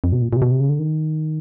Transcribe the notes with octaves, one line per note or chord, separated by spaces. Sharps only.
F2
B2
A#2
A#2
C3
B2
C3
C#3
D3
D#3